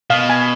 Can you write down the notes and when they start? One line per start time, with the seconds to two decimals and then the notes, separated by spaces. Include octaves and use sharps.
0.10 B2 F5
0.30 G#5